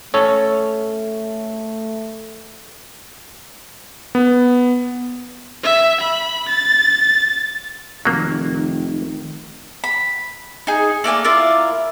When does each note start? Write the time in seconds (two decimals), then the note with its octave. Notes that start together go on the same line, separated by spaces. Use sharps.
0.14 A3 C#4 A4 C#5
4.15 B3
5.63 E5
6.01 B5
6.49 A6
8.05 F1 D#3 F#3 A#3
9.84 B5
10.67 D#4 G#4
11.04 A3 A#3 D5 G#5
11.24 E4 F4 A#4 D5